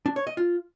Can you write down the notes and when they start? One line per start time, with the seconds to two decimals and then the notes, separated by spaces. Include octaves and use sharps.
0.06 D4
0.16 C#5
0.27 D#5
0.37 F4